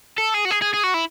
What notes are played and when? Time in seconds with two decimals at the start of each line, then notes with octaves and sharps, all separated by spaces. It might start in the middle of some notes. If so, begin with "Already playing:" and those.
0.18 A4
0.34 G#4
0.45 F#4
0.51 G#4
0.62 G#4
0.74 G#4
0.84 F#4
0.94 E4